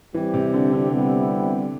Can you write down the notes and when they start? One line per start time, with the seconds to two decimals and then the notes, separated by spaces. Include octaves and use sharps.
0.14 E3 G3 C4 G4
0.34 C3
0.53 D3
0.72 D3
0.91 C3 G3 B3 E4 G4